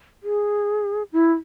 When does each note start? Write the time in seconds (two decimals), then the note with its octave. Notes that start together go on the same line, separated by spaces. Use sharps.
0.23 G#4
1.12 E4